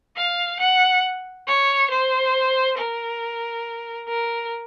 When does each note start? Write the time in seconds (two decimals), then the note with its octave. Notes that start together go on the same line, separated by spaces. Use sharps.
0.16 F5
0.60 F#5
1.47 C#5
1.91 C5
2.78 A#4
4.09 A#4